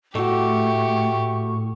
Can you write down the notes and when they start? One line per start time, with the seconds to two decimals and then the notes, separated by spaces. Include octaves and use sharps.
0.15 A2 A3 F#4 G4 C#6